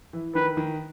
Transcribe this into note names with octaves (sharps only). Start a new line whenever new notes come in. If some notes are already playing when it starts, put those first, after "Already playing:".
E3
D#3 B4
D#3